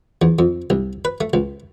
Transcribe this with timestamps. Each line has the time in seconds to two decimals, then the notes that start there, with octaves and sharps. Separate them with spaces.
0.22 E2
0.39 F2
0.70 C2
1.05 B4
1.21 A3
1.33 C#2